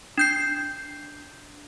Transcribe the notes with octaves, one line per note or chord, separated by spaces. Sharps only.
D4 G6 C7